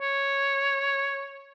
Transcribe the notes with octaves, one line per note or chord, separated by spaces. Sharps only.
C#5